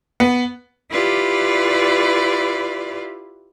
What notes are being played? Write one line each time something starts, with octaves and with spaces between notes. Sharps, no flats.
B3
E4 F4 G4 B4 D5